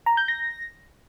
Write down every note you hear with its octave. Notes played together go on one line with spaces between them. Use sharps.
A#5
G6
A#6